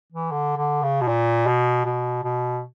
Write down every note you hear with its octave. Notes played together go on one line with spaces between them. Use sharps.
E3
D3
D3
C#3
B2
A#2
B2
B2
B2